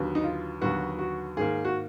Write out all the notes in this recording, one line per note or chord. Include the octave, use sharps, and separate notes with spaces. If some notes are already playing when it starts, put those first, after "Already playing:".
Already playing: D#2 D3 F#3 B3
D#4
F4
D#2 D3 F#3 B3 F#4
F#4
G#2 D#3 A#3 G#4
F#4